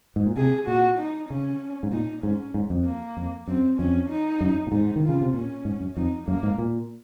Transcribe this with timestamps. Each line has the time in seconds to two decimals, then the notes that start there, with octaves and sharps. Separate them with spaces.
0.16 G#2
0.26 A#2
0.37 C3 G#4
0.67 A#2 F#4
0.99 D#4
1.30 C#3 C#4
1.83 G#2
1.92 A#2 D#4
2.23 G#2 C#4
2.54 G#2
2.70 F2
2.85 A#3
3.17 F2
3.47 F#2 C4
3.79 F2 C#4
4.10 D#4
4.41 F#2
4.67 A#2
4.72 G#2 D#4
4.96 D#3
5.03 F4
5.09 C#3
5.21 C3
5.34 A#2 C#4
5.65 G#2
5.81 F#2
5.96 F2 D#4
6.27 F#2 A#3
6.43 G#2
6.58 A#2